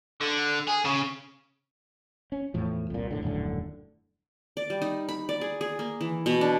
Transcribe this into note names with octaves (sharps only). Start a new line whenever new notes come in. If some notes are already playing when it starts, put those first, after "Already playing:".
D3
G#4
C#3
C#4
E2 A2 F3
C2 A#2
E1 A2 D3
D#1 F#2 A2 D3
D5
G3
D#4
B5
D5
G#4
G#4
A#3
E3
B2
D4